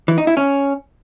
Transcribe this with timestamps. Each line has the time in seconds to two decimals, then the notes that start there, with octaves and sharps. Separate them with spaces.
0.08 E3
0.18 D#4
0.27 E4
0.37 C#4